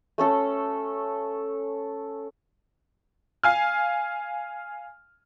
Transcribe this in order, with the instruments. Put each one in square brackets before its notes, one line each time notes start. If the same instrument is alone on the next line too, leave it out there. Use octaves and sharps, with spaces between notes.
[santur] A3 C#4 A4
[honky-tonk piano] F5 G#5 F6